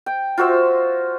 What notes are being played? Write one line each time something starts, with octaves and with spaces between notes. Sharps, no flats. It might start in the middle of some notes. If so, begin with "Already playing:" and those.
G5
F4 F#4 C5 E5